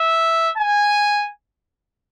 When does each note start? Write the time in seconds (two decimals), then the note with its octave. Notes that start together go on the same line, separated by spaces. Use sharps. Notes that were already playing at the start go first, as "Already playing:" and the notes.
Already playing: E5
0.58 G#5